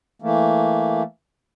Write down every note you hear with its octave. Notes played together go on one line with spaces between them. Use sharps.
E3 A3 A#3